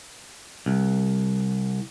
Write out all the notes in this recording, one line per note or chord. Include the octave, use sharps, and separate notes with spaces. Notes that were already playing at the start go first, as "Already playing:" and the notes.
C2